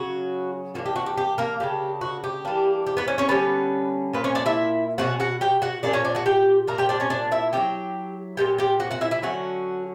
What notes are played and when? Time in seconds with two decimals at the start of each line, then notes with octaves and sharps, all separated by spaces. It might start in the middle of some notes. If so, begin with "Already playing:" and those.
Already playing: C#3 F#3 C#4 F#4
0.74 E3 A#3 D4 F#4
0.86 G4
0.96 F#4
1.06 G4
1.17 G4
1.38 A#3 A#4
1.60 C#3 E3 A#3 D4 G4
2.01 F#4
2.24 G4
2.45 E3 G3 A#3 D4
2.86 G4
2.97 B3 B4
3.08 C#4 C#5
3.18 C#4 C#5
3.28 D3 G3 B3 C#4 B4
4.13 A#2 A#3 B4
4.24 C#4 C#5
4.35 D4 D5
4.46 E4 E5
4.98 B2 F#3 C#4 F#4 F#5
5.20 F#4 F#5
5.41 G4 G5
5.62 F#4 F#5
5.83 A#2 F#3 A#3 C#4 D4 D5
5.93 C#4 C#5
6.05 D4 D5
6.15 F#4 F#5
6.26 G4 G5
6.67 A#2 A#3 D4 A#4 A#5
6.78 G4 G5
6.89 D4 D5
7.00 C#4 C#5
7.10 D4 D5
7.32 E4 E5
7.53 F#3 C#4 E4 G4 G5
8.37 A#2 F#3 B3 G4 G5
8.58 G4 G5
8.80 F#4 F#5
8.91 F#4 F#5
9.01 E4 E5
9.11 E4 E5
9.22 D3 F#3 C#4 F#4 F#5